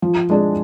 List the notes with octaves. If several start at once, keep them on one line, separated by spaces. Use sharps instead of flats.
F3
G#3 D4 G#4